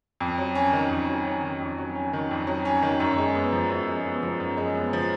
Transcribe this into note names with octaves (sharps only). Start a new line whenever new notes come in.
F2
F#3
C#4
D#3
F2
F#3
C#4
D#3
F2
F#3
C#4
D#3
F2
F#3
C#4
D#3
F#2
G#3
B3
F3
F#2
G#3
B3
F3
F#2
G#3
B3
F3